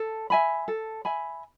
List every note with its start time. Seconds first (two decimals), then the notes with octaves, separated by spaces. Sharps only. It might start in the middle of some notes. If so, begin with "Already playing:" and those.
Already playing: A4
0.30 E5 G#5 B5
0.68 A4
1.05 E5 G#5 B5